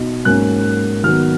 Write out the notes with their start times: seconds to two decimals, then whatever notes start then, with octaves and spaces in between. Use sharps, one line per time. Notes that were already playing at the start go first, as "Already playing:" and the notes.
Already playing: B2 D#4
0.25 G#2 F#3 A#3 C#4 F#6
1.04 D#3 F#3 B3 F6